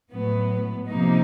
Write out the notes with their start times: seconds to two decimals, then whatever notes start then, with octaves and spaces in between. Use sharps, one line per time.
0.12 A2 F#3 B3
0.90 C3 F3 A#3 D#4